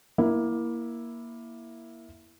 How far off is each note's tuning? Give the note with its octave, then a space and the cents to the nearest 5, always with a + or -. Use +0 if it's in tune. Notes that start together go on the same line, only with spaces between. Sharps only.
A#3 +15 E4 +0